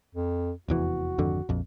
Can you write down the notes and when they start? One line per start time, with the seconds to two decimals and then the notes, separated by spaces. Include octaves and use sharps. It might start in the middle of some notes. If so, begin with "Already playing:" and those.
0.15 F2
0.68 F1 E2 E3 F#4
1.18 G#1 F2 D3
1.49 A#1 F2